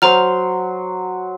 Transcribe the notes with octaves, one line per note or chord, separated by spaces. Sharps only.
F#3 C5 A#5 C6 F6